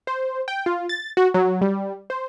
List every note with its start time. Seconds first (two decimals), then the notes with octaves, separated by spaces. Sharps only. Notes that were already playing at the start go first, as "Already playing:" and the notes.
0.07 C5
0.48 G5
0.66 F4
0.89 A6
1.17 F#4
1.34 F#3
1.61 G3
2.10 C5